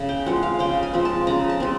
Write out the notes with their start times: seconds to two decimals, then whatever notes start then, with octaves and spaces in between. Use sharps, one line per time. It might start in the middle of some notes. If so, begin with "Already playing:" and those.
Already playing: C#3
0.09 G5
0.26 F3 G#3 C4 F#5
0.43 F5
0.59 C#3 G5
0.83 G#5
0.94 F3 G#3 C4
1.05 A5
1.27 C#3 A#5
1.49 A5
1.60 G#3 C4